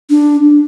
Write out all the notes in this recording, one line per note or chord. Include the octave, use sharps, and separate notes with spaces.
D4